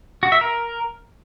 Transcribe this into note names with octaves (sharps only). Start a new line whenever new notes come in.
F#4
E5
A#4